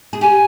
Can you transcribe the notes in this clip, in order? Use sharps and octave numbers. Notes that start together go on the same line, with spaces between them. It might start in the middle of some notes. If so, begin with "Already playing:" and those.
G#4
G4 G#5